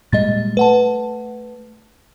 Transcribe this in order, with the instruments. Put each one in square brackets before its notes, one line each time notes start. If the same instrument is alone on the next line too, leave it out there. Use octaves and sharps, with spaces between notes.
[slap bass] A#2 G3 G#3 [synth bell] D#5 A6
[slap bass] A3 [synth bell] B4 F#5 A5